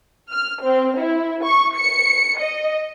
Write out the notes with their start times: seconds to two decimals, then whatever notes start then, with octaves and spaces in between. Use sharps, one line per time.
0.30 F6
0.63 C4
0.99 E4
1.44 C#6
1.77 C#7
2.40 D#5